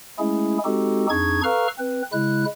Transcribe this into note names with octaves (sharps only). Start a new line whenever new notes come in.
G#3 A3 C#4 E4 G#4
G#3 C4 D#4 F#4 G4 A4
F2 D4 D#4 G#4 C#6 G#6
A4 B4 F5 A#5 C#6 F6
C4 B4
C#3 G#3 E4 F#6